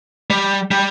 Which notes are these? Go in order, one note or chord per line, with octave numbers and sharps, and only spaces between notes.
G3
G3